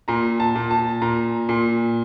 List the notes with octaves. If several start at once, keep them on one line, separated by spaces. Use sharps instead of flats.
A#2 A#5
A5
A#2
A5
A#2 A#5
A#2